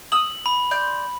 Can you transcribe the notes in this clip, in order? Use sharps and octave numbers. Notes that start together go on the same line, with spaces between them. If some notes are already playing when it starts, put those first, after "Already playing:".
D#6 E6 F#7
B5
D5 C6 G6